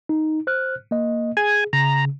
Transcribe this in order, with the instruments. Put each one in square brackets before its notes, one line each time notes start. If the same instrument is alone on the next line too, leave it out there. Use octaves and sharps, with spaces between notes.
[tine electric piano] D#4
C5 F6 F#6
A#3 D#5
[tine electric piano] G#4 [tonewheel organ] G#5
[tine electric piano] C#3 [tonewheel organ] A#5